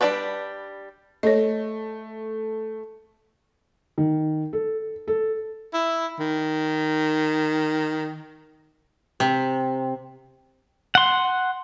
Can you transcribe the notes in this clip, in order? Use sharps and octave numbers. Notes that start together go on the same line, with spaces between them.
G3 D4 A4 B4 D5
A3 C#5 D#5
D#3
A4
A4
E4
D#3
C3
F#5 C6